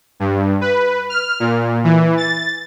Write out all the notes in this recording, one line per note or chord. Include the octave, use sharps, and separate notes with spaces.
G2
B4
F6
A#2
E3
A6